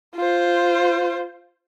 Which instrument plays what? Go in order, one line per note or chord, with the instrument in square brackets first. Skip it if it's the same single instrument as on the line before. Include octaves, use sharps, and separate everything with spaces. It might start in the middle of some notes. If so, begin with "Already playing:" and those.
[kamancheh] F4 C5